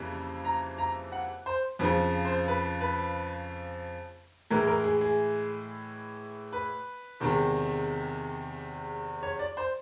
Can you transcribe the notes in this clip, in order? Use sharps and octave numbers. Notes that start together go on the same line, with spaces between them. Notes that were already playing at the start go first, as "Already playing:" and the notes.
Already playing: F2 C#3 E3 G3 A#3
A#5
A#5
F#5
C5
F2 C#3 F3 B4
C5
B4
B4
A2 E3 G#3 A#4
A#4
G#4
G#4
B4
E2 C3 D#3 G#3
C#5
D5
C5